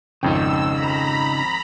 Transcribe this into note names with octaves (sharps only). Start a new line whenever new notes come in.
G#1 F2 C#3 D#4 G5 E6
A#5 B5